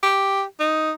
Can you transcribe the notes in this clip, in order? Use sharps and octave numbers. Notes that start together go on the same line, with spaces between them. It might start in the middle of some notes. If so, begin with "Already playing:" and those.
G4
D#4